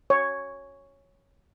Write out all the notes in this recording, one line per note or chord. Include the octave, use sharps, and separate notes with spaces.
C#5